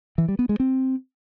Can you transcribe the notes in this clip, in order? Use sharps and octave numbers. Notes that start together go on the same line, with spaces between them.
E3
G3
B3
G#3
C4